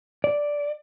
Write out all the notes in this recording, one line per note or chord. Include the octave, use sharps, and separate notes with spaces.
D5